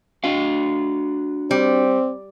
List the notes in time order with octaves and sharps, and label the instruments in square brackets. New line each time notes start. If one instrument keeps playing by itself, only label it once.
[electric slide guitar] D4 F#4 F5
[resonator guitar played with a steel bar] G3 [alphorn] C4